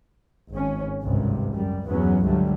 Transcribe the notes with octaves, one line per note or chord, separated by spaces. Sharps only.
G#1 C#4
G#1 C#2 G2 C3
F#2 G3
E2 G2 E3 F#3 B3 C#4
C#2 D3 F#3 G3 A3